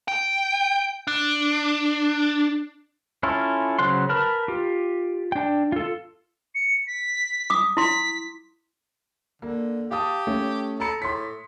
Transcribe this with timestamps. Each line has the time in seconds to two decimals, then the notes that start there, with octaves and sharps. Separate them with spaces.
0.08 G5
1.07 D4
3.23 C#4 E4 F4 A4
3.79 C#3 F#3 C5 F#5 C6
4.09 A#4 B4 A5 B5 F6
4.48 F4 G4
5.32 D4 G5
5.72 F4 A4
6.55 C#7
6.87 B6
7.50 D6 D#6
7.77 E4 C6 B6
9.42 D3 A#3
9.91 G4 F5 A5 D#6
10.27 A3 C#4
10.80 A4 A#5 B5 C#7
11.02 A2 C6 B6